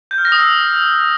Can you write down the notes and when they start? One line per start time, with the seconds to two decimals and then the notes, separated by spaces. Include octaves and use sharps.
0.11 G6
0.18 F6
0.25 A#6
0.32 D#6
0.39 E6